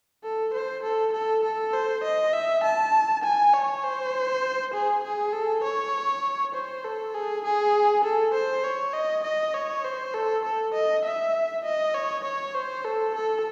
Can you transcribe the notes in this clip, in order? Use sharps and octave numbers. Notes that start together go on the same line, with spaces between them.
A4
C5
A4
A4
A4
C5
D#5
E5
A5
G#5
C#5
C5
G#4
G#4
A4
C#5
C5
A4
G#4
G#4
A4
C5
C#5
D#5
D#5
C#5
C5
A4
A4
D#5
E5
D#5
C#5
C#5
C5
A4
A4